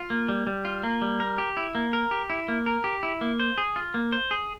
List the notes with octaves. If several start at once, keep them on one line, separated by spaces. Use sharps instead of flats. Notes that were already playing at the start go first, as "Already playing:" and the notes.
Already playing: F4
A#3
G3
G3
F4
A#3
G3
A#4
G4
E4
A#3
A#4
G4
E4
A#3
A#4
G4
E4
A#3
C5
G#4
F4
A#3
C5
G#4